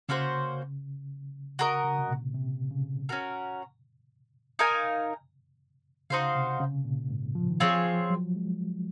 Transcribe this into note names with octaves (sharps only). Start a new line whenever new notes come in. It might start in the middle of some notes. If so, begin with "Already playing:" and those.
C#3 A#3 C#4 F#4 C5
C#3 F#4 A#4 D#5
C#3
C3
A#2
C3
C#3
C#4 F#4 A#4
D#4 A#4 F5 G#5
C#3 D#4 F#4 C5 F5
C3
C#3
A#2
G#2
F3
D#3
F3 C4 F4 G#4 C#5
F3
F#3
G#3